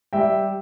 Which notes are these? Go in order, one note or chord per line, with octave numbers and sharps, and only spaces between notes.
G3 E5 G5